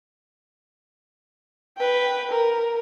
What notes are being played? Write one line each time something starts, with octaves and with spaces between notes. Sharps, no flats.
B4 G5
A#4